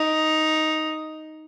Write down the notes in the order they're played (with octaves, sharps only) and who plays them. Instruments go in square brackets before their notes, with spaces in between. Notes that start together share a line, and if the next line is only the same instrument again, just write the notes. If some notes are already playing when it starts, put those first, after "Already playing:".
Already playing: [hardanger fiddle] D#4